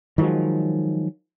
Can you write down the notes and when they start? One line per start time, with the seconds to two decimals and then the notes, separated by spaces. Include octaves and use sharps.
0.18 D#3 F3 F#3 G#3